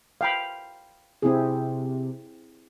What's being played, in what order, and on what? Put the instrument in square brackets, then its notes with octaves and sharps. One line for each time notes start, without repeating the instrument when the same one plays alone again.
[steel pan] F5 G5 B5
[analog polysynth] C3 [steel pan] C4 E4 G#4